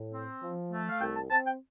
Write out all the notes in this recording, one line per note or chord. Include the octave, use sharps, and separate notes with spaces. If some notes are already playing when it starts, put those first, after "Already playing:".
Already playing: A2
C4
F3
A3
F5
C2 G5
A5
C4 A5
G5